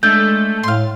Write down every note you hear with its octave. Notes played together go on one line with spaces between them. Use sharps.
G#3 A3 D4 A4 B4 G6
A2 F5 C6